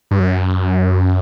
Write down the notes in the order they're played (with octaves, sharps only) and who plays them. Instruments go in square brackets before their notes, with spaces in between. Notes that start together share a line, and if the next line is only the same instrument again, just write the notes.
[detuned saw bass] G2
F#2